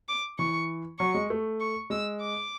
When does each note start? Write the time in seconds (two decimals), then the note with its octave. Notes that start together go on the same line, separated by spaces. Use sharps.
0.08 D6
0.38 E3 C#6
0.99 F#3 C#6
1.15 G#3
1.30 A3
1.60 C#6
1.90 G#3 E6
2.21 D6